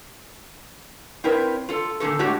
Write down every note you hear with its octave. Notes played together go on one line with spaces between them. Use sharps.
C4 E4 A#4 B4 C#5 G5
F4 A4
A#2 D3 F#3 G4 A4
A2 G#3 F#4 G4 C#5